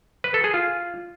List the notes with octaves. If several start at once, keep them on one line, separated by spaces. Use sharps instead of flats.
B4
A4
G#4
F4